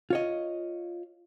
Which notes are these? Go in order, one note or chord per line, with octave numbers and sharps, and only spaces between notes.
F4 C#5 D#5